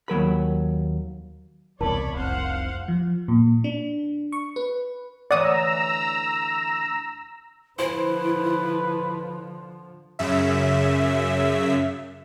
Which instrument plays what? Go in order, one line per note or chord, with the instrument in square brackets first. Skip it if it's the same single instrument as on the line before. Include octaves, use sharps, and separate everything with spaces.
[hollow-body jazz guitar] D#2 F#3 A#4 B5
[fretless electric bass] E1 C2 [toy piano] A#4 A5 [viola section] C#5 D5 B5
[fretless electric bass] F1 C2 [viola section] C5 F5 F#5
[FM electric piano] F3
A#2
D4
C#6
B4
[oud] D2 E3 C#5 [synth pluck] D5 F#5 D#6 [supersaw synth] A#5 E6
[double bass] D3 F3 [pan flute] E4 [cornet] B4 [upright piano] C5
[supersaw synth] F#2 C#3 E5